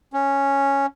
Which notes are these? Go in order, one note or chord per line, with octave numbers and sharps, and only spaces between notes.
C#4